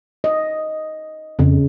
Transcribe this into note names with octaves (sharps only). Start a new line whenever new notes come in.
D#5
F2 C#3